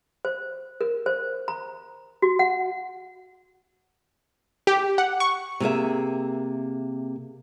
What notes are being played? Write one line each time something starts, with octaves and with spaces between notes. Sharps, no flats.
C5
A#4
C5
A#5
F#4
F#5
G4
F#5
C#6
C3 A#3 G#4 E5